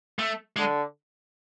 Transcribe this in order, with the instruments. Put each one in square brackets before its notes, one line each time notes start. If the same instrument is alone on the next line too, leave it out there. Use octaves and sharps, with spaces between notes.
[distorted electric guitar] A3
[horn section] D3 [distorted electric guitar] G#3